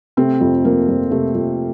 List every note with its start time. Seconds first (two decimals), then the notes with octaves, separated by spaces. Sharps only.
0.17 C3 A3 C4
0.41 F2
0.65 F3 A#3
0.88 F2
1.11 C3 A3
1.35 F2